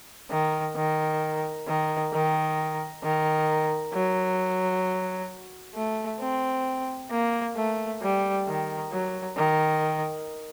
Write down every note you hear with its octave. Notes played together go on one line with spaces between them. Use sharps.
D#3
D#3
D#3
D#3
D#3
F#3
A3
C4
A#3
A3
G3
D#3
F#3
D#3